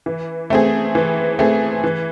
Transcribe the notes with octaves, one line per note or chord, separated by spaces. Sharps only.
E3
A3 C4 G#4
E3
A3 C4 G#4
E3